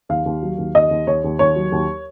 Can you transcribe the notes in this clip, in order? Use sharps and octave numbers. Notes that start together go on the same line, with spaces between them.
D#2 F5
D#2
F#3
D#2
D#2 D#5
D#2
D#2 C#5
D#2
D#2 C#5
F#3
D#2